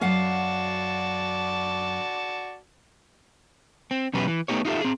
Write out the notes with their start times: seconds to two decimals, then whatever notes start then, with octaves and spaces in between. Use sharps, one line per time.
0.01 F#2 F#4 D5 F5 F#5 A5
3.91 C4
4.13 E2 B2 F#3 C#4 G4 B4
4.27 E3
4.48 A3 B3 D#4 G4 C#5
4.65 D#4 F4 G4 A4 E5
4.81 C4 G#4